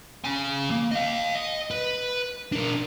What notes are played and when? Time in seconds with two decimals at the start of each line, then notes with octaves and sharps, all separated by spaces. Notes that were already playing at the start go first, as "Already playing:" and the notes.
0.25 C#3 G#5
0.71 A#3
0.91 D#5 F5
1.37 D#5
1.71 B4
2.52 D4 A#4